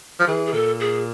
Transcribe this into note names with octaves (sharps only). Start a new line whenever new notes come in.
F3
E3 G#4
G#4
A#2 A4
G#4